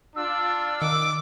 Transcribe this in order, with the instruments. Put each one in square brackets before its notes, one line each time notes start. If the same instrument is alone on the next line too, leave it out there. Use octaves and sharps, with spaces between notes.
[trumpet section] D4 F4 [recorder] E6
[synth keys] D#3 [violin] D6